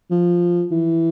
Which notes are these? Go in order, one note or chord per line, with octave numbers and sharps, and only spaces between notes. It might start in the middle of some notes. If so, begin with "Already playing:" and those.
F3
E3